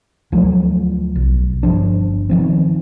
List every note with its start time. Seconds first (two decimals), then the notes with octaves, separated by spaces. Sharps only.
0.32 D2 F3 F#3 A3
1.16 B1
1.63 G1 F3 D4
2.29 D#3 F3 C4